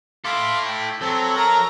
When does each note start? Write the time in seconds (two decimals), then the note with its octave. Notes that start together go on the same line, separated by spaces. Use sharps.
0.25 E4 A4 F5 C6 D6
0.66 G5
1.01 F#3 C4 A4
1.36 A4 A#4 A#5